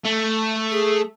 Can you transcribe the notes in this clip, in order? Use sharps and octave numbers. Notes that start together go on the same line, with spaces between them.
A3
G#4